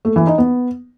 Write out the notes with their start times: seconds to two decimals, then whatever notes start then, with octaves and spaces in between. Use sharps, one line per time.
0.05 A3
0.16 E3
0.27 D#4
0.38 B3